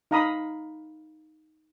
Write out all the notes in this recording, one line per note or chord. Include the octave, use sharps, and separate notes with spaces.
D#4 F5 A#5 B5 D#6